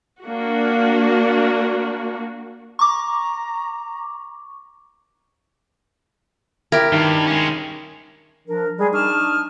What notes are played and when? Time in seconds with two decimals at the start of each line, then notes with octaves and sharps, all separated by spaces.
0.23 A#3 D4 F#4
2.79 A#5 C#6 D6
6.72 E4 G4 A#4
6.92 G2 D#3
7.27 G#3 C#4
8.47 F3 D4 A#4
8.78 G3 G#3 G#4
8.92 D4 D#4 A5 C#6 D#6 F6